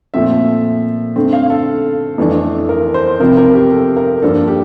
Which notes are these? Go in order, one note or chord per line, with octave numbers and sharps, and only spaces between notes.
A#2 F3 A3 C4 E5
D3 A3 C4
F5
A4
F2 E3 A3 D4
A#4
C5
C3 F3 C4 A#4
A#4
G4
A4
A#4
G2 F3 A#3 D4 A4
G4